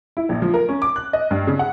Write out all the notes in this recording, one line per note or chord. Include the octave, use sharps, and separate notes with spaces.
E4
A#1
F3
A#4
C#4
D6
F#6
D#5
G2
C#3
F#5